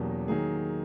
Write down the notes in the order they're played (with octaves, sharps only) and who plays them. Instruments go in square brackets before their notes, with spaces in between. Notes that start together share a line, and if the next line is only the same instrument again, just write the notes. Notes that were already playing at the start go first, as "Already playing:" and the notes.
Already playing: [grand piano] E2 B2 F#3 A#3 C#4 G4
D#3 F#3 A#3 G#4